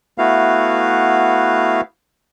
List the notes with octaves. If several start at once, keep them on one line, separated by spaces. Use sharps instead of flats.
A3 B3 E4 F#4 B4 F5